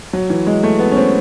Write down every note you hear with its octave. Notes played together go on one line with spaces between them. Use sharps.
F#3
E3
G#3
A3
B3
C#4
C4